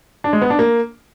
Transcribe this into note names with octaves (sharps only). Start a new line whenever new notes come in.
D4
G#3
B3
D4
A#3